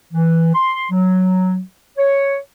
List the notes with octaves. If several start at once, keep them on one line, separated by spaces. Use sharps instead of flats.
E3
C6
F#3
C#5